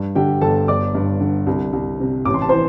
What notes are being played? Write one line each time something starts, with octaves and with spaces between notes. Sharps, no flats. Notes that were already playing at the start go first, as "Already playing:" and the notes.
Already playing: G2
D3 G4 G5
G1 A4 A5
G1 D5 D6
G2
D3
C2
C2
C3
A1 D6
C6
A5
E3 C5 C6